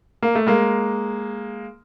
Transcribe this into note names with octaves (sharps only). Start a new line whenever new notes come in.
A#3
A3
G#3 A#3